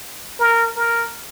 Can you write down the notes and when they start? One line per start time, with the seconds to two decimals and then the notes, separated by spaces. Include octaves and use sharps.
0.40 A#4
0.77 A#4